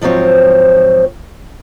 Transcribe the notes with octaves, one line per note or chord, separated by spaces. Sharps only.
G#2 F3 F#3 C4 C#5